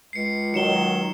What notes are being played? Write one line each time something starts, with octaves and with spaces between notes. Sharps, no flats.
C#2 C7 C#7
D#3 F#3 C#7 E7 G7